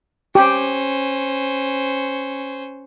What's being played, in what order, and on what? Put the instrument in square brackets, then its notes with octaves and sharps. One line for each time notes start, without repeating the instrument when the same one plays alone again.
[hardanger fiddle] C#4 C5 [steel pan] G4